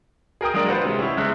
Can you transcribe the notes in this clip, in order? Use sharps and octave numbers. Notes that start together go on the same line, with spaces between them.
G#4 A#4 G5 D#6
F#3 G#3 A#3 D4 A#4
F4 B4 C5 F5 F#5
C3 G#3
C#4 E4
E2 C#3 G#3 E5 F#6